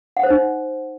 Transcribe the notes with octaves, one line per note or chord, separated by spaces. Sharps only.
F#5
C5
D#4